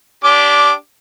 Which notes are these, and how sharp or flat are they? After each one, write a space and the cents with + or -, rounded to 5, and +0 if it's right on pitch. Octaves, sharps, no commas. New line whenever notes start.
D4 -25 G4 +0 D6 +0